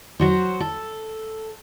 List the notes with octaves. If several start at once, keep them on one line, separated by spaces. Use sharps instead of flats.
F#3 F#4 C5
A4